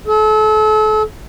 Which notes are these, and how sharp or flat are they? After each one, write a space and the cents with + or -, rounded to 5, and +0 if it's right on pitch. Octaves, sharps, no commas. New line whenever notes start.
A4 -35